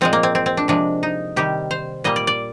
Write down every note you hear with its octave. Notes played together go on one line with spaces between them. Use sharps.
A#2 F3 G#3 C4
A#3
C4
C4
C4
D4
C3 F3 G#3 D4
D#4
C3 D#3 G3 G4
C5
A#2 G3 A#3 D#5
D5
D5